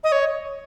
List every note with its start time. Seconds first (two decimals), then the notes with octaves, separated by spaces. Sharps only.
0.04 D#5
0.12 C#5